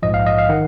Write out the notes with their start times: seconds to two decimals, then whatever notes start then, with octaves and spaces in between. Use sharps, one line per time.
0.03 A#1 G#2 F3 D#5
0.14 F5
0.26 D#5
0.38 F5
0.49 D#3 F#5